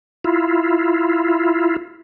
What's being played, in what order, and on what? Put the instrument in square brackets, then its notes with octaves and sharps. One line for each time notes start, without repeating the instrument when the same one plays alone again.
[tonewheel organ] E4 F4